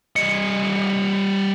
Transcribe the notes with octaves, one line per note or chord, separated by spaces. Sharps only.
G3 D#5 C#7